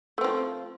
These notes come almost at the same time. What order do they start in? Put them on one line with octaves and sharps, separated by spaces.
A3 C4 F3